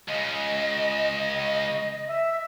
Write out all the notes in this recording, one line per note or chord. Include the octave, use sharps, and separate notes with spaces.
C#2 C#3 D#5
E5